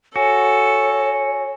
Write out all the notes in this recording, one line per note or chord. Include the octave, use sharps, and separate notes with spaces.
F#4 A4 C#5 G#5